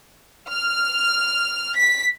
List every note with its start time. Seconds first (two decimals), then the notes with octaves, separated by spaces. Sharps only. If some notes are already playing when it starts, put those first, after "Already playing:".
0.48 F6
1.76 B6